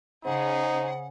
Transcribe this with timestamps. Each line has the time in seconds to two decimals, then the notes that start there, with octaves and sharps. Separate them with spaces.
0.25 C#3 D#4 G#4 C5 F#5